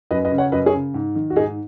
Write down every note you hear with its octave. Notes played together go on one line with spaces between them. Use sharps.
F#2 B4 D#5
B4 D#5
C#3
C#5 F#5
F#2 B4 D#5
G#4 C#5
C#3
G#2
D#3
F#4
G#2 D#4 G#4